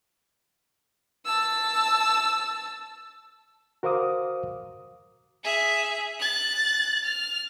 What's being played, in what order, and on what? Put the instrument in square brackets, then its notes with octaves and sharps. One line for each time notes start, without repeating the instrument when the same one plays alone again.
[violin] A5 E6
[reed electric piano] F#4 A#4 C5 F5 D6 D#6
[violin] G#4 E5
F#6 A6
F6